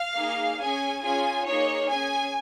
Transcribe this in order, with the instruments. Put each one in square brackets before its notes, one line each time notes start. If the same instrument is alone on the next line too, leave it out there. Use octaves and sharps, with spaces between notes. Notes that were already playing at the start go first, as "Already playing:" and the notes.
Already playing: [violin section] F5
A#3 D#4 G#4
C#4 G#4 G#5
C#4 F4 G#4 G#5
A#3 D#4 G#4 C#5
C#4 G#4 G#5